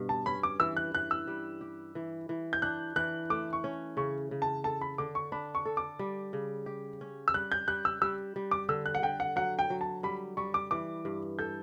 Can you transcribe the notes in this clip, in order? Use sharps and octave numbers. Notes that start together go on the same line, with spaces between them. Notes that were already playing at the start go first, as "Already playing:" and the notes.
Already playing: G2 B2
A5
C#4 B5
D6
E3 E6
F#6
E3 F#6
E6
G3
G4
E3
E3
G6
D4 F#6
E3 F#6
A3 D6
C#6
C#4
C#3 C#6
C#3
A5
A4 A5
B5
D3 D6
C#6
D4 B5
C#6
A4
D6
G3
C#3
G4
C#4
E6
G3 F#6
G6
G3 F#6
E6
G3 E6
G3
D6
D3 E6
F#6
F#5
D3 G5
F#5
F#3 F#5
G5
F#3
A5
G3 B5
G3 C#6
D6
E3 D6
G2
A4 G6